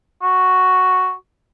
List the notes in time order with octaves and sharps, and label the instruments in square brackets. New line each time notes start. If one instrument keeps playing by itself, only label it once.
[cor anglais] F#4